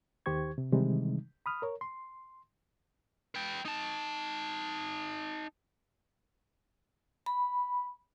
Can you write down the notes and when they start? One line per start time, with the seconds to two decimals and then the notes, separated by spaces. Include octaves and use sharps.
0.26 D#2 D#3 G4 C5 C#6 G#6
0.58 C3
0.72 C3 D#3 E3 G3 G#3 D#4
1.46 B5 D#6 F6
1.62 A#4 C#5
1.81 C6
3.35 B4 G5
3.65 D#4 A5
7.26 B5